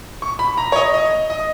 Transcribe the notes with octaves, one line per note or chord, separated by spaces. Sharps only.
C#6
B5
A#5
C#5
D#5
D#5
D#5